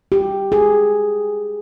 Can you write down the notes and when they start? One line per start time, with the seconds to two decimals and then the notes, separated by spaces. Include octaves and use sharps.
0.12 G4
0.52 G#4